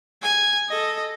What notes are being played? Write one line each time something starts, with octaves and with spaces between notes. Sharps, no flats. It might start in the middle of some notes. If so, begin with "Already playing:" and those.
G#5
A4 D#5